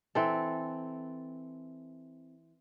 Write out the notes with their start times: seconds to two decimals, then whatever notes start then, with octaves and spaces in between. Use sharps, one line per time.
0.15 E3 C4 A4